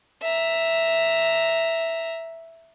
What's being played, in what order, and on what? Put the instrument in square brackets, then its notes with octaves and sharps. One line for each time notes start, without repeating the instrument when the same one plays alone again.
[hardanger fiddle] E5 A#5